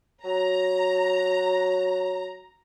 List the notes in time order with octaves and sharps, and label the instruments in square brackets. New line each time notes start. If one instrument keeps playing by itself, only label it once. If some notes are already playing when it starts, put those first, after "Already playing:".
[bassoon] F#3 [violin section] A#5